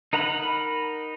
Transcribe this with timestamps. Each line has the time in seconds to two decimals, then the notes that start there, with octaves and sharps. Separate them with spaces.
0.13 D#4 A#4 F#5 A#5 B5